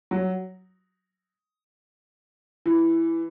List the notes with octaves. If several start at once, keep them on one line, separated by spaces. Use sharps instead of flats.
F#3
E3